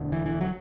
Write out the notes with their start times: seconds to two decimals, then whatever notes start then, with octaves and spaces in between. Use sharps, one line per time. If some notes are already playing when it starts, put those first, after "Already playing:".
Already playing: E1 D2 D3
0.12 E3
0.26 E3
0.41 F#3